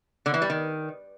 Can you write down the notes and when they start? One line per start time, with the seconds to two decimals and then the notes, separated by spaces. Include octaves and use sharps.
0.26 D3
0.34 E3
0.42 G3
0.50 D#3